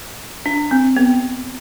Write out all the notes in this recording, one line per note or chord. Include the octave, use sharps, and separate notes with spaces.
D4
C4
B3